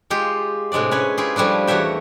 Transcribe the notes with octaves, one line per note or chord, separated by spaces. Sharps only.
G#3 F4 G4
A2 C3 G#3 D4 D5
C#4 B4 C#5 G#5
E4 F4 G4 G#4
F3 G3 A3 D4 E4
E2 F#4 C#5 E5 G5